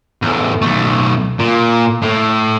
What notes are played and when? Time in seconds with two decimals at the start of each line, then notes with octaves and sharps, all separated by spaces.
0.22 E2 A2
0.62 B1 A3
1.39 A#2
2.02 A2